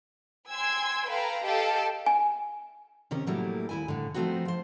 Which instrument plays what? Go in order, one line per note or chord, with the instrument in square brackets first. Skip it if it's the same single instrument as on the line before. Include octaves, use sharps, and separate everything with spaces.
[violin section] G5 G#5 C6 E6 G#6
A4 B4 F5 G5 A#5
G4 A4 D#5 F5 G5 A5
[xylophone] G#5
[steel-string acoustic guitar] C3 D#3 C#4 A#4
A2 F#3 G3 A3 A#3 E4
D#2 E4 G#5
A2 D3
F3 A3 B3 C4 D#4 F#4
F3 C5